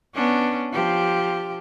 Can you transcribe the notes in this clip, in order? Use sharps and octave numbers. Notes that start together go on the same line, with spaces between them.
B3 C#4 D4
F3 G4